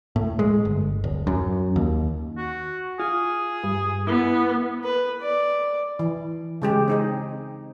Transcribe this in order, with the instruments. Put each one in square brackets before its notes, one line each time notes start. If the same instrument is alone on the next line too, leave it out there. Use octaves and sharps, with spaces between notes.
[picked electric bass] A2
G#3
G1
D1
F#2
D#2
[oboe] F#4
[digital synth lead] F4 [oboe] G#4
[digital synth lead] G2
[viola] B3 [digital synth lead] E4
[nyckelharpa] B4
D5
[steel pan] E3
C#3 G#3 G4
C4 D#4 G#4